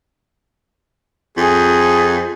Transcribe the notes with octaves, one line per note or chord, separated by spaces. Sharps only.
F2 G#4